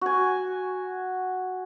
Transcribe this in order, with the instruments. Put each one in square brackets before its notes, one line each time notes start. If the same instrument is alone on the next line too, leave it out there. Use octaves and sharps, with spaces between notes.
[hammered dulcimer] F#4 G#5